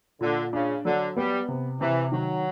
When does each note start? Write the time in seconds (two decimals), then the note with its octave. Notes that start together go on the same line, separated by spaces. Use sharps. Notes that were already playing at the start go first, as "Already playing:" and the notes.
0.21 A#2 D3
0.53 C#3 D4
0.85 D3 F#3
1.17 G3 B3
1.48 C3
1.80 C3 E3
2.12 D#3 F#3